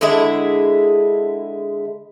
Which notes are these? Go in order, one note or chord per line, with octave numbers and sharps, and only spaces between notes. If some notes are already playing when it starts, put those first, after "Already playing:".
D3 G#3 E4 G#4